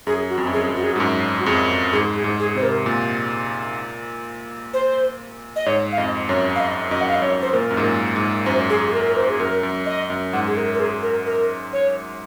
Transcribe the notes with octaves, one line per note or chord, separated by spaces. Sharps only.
F#2 G#4
F#4
F2
F#2
F2 G#4
F#2
F#4
G#4
F#4
G#2
F#2
F#4
F2 G#4
G#2 G#4
G#4
G#2
G#4
C3 C5
A#4
A#2
C5
D#5
G#2 C#5
F5
F2 D#5
F#2 C#5
F5
D#5
F#2 D#5
F#5
F5
D#5
F#2 C#5
C5
A#2 A#4
F#2
G#2
A#2
G#2
F#2 C5
G#4
G#4
A#4
A#4
C5
G#4
F#2 A#4
F#2
D#5
F#2
G#2 F#5
G#4
A#4
A#4
G#4
A#4
A#4
C#5